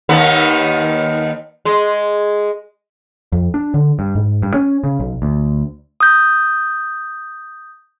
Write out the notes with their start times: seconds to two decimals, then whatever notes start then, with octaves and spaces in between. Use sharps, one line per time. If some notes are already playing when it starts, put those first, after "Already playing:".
0.09 D#2 D#3 B3
1.65 G#3
3.32 F2
3.54 D4
3.74 D3
3.99 G2
4.15 G#2
4.42 G2
4.54 C#4
4.84 C#3
5.00 B1
5.22 D2
6.00 D#6 G6